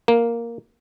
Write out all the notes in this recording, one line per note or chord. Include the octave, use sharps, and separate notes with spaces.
A#3